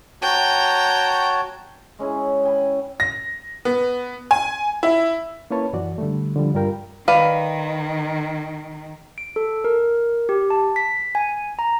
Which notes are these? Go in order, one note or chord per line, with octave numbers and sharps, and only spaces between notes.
F#4 C#5 G5 A5 A#5
G#3 C#4 E4 G#4
G5 G#5 B5
A#6
B3
G#5
E4
A#3 C#4 E4 B4 C#5 A5
F#2 E3 F#4 D5
D3 G3 A3
D3 F3 G3
G2 G3 F4 A#4 G5
D#3 B4 D5 F5
D7
A4
A#4
G4
A5
B6
G#5
A#5